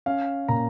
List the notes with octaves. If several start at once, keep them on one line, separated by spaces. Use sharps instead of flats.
C#4 F5
A#2 A#5